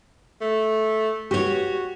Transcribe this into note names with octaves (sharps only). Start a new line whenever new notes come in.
A3
F#4 G4 C#5